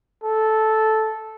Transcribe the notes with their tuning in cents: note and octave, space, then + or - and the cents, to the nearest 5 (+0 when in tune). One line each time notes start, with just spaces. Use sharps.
A4 -10